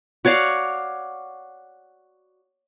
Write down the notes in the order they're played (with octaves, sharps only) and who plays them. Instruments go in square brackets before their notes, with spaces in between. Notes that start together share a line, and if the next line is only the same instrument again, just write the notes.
[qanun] F#4 C#5 D5 F5